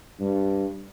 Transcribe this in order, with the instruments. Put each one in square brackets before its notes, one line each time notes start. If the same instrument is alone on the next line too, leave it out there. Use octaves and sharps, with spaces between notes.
[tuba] G2